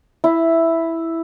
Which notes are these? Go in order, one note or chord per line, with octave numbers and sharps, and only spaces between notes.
E4